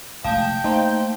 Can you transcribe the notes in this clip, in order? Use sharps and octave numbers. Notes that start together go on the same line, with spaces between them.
F1 G#3 A3 F5 G5 A5
A3 A#3 D#4 C5